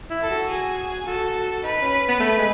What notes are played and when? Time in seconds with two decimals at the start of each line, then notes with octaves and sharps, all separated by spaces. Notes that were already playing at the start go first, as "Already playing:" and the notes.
0.10 E4
0.20 A4
0.30 F#4
0.48 G#4
1.06 F#4 A4
1.63 D#4 B4
1.82 C#4
2.08 B3
2.20 A3
2.38 G#3